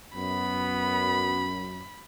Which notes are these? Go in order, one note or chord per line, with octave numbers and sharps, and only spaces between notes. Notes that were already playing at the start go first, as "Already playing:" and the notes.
F#2 B3 B5